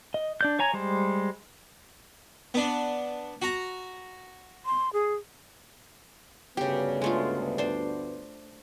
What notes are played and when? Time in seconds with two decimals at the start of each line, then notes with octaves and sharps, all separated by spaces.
0.14 D#5
0.41 D4 D5 G6
0.59 C#5 G#5 A#5
0.73 G3 G#3 C5
2.54 B3 D4
3.42 F#4 A#5
4.66 C6
4.93 G#4
6.57 D2 G2 C#3 B3 G4
7.02 G#3 A3 F4
7.58 D4 C5